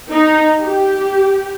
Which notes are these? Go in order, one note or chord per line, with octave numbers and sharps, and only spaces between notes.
D#4
G4